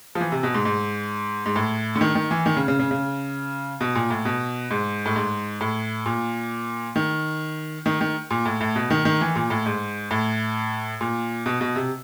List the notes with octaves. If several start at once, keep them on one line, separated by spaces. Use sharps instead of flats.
F3
E3
C3
B2
G#2
G#2
G#2
A2
D3
D#3
D#3
E3
D#3
C#3
C#3
C#3
C#3
B2
A#2
A2
B2
G#2
A2
G#2
A2
A#2
D#3
D#3
D#3
A#2
A2
A2
B2
D#3
D#3
E3
A#2
A2
G#2
A2
A#2
B2
B2
C3